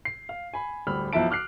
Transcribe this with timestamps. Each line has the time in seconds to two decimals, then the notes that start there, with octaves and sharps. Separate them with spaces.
0.05 C7
0.29 F5
0.54 G#5 B5
0.87 D1 G3 B5 E6 F6
1.13 B1 F3 E4 E5 A5 D7
1.31 D6 F6 F#6 C7